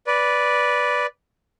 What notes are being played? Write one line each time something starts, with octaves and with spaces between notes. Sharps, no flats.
B4 D5